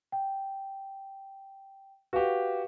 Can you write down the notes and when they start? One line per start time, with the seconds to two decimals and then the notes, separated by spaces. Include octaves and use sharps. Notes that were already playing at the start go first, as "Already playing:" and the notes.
0.12 G5
2.13 F#4 G4 B4 F5